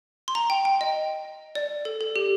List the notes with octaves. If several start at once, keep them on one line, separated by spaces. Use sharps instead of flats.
C6
A#5
G5
G5
D#5
D5
A4
A4
G4